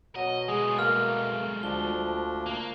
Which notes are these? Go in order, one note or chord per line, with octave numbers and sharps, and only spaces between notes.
B2 F#3 D#5
G#3 A3 G#4
A#3 F6
D2 F3 D4 G7
A#3